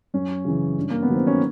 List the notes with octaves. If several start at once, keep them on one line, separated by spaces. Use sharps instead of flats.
F#2 C#4
C#3 E3
G2
A#3
B3
D#3 F#3
C4
C#4